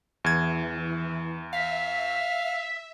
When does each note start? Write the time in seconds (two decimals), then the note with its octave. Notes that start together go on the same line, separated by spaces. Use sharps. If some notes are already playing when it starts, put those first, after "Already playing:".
0.24 E2 E3 G#6
1.53 E5 F5 B6